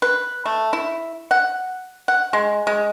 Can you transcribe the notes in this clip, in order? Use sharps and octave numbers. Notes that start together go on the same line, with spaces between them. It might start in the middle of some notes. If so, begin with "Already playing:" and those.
B4
A3
E4
F#5
F#5
G#3
G#3